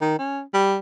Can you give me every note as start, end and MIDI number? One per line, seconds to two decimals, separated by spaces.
0.02 0.18 51
0.19 0.41 61
0.54 0.77 55